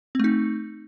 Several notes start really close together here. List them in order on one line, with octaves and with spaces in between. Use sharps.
C4 A3 D#4